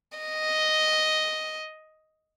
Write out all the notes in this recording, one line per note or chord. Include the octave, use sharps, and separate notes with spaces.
D#5